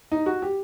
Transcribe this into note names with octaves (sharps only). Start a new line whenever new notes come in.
D#4
F#4
G4